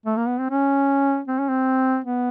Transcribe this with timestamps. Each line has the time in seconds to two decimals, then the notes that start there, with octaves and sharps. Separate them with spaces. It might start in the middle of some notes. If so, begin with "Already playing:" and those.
0.06 A3
0.16 A#3
0.27 B3
0.39 C4
0.50 C#4
1.28 C4
1.39 C#4
1.49 C4
2.04 B3